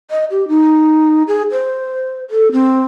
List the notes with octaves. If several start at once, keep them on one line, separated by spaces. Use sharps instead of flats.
D#5
G4
D#4
G#4
C5
A4
C4